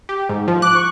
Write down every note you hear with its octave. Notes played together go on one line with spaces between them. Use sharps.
G4
G#2
F3
D6 F#6
C#6